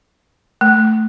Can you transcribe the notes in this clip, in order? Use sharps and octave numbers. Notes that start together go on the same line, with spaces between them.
A3